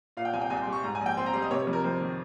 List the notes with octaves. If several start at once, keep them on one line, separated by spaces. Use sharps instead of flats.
A#2 F5
G5
C2 G#5
G5
C2 G#5
C6
G3
C#6
G#2 A#5
G#5
A#1
G5
C4 C6
A#5
G3 C6
D#5
C3 C#5
F2 C#5
A#4
F2 C5
D#3